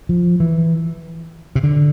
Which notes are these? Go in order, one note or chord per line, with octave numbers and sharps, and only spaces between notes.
F3
E3
C3
D3